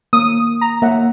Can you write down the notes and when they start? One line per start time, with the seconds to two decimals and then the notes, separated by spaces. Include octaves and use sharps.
0.13 A#3 D#6
0.61 A#5
0.82 A#3 E5 F#5